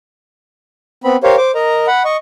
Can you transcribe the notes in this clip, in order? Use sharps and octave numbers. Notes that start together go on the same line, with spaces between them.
B3 C4 B5
G4 A#4 C5 C#5 F5
C5 D6
A#4 D#5 A#5
F#5 B5
D#5 C#6